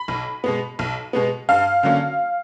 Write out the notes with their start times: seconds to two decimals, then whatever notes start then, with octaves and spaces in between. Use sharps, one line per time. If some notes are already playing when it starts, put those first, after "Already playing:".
Already playing: B5
0.08 B1
0.44 B2 G#3 B3
0.79 B1
1.13 B2 G#3 B3
1.49 G2 F5
1.83 D3 F#3 A#3 C#4